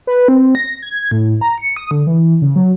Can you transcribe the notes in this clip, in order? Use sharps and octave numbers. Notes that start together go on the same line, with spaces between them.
B4
C4
A#6
G#6
A2
A#5
C#7
D#6
D3
E3
C#3
F#3